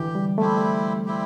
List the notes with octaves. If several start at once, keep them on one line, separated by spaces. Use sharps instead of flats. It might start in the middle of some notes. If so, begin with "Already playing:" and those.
Already playing: D3 E3 G4
G3
G3 A3 C4 E4 G4
G3 C4 E4 G4